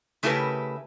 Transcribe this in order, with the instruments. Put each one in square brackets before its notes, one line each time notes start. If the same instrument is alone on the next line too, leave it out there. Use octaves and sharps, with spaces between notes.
[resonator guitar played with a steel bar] C#3 A3 E4 G4 A#4 B4